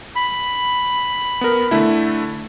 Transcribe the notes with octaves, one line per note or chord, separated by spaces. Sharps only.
B5
B3 A#4
D3 A3 E4